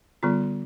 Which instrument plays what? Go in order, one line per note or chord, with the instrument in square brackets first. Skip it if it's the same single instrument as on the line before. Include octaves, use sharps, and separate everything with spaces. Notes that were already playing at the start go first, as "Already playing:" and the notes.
[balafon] D3 G3 B3 F4